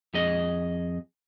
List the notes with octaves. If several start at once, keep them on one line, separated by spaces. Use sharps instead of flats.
F2 G#4 D#5